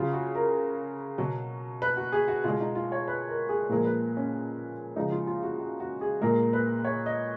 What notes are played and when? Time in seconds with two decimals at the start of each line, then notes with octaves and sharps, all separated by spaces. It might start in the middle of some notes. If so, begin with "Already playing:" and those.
Already playing: C#3 F#3 F4
0.13 F#4
0.35 A#4
1.18 B2 F#3
1.82 B4
1.97 F#4
2.12 G#4
2.28 F#4
2.44 B2 G#3 F4
2.60 D#4
2.75 F4
2.92 C#5
3.08 B4
3.28 A#4
3.49 G#4
3.69 A#2 F3 G#3 A#4
3.85 B4
4.17 C#4
4.96 C#3 F3 G#3 D#4
5.12 F4
5.27 F4
5.43 F#4
5.59 F#4
5.80 F#4
6.01 G#4
6.21 A#2 G#3 A#4
6.53 B4
6.85 C#5
7.06 D#5